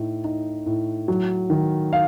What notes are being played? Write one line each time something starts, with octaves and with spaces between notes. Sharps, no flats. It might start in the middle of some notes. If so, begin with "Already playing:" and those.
Already playing: A2 D#4
D#4
A2
F#3
D#3
F5